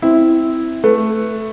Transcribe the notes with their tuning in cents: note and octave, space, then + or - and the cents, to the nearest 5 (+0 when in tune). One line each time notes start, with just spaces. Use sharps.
C4 -5 E4 -10
A3 +0 B4 +0